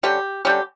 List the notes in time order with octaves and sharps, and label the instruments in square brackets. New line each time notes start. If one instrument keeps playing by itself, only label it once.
[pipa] D3 G3 C#4 G4
D3 G3 C#4 G4